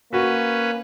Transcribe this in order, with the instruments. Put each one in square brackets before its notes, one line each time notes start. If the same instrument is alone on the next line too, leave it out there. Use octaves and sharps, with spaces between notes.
[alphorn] A#3 [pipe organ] C#4 B4 [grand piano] F#4